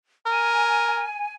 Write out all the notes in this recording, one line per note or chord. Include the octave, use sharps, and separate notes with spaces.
A#4 G#5